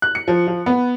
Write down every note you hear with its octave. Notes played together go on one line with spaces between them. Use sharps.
F#6
C#7
F3
F3
B3